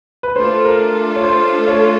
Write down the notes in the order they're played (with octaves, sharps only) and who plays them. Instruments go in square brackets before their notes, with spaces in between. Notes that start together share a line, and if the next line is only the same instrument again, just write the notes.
[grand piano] B4
[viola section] A3 D4 F4 A4 [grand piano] C5
[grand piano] A#4
C#5
C5
C#5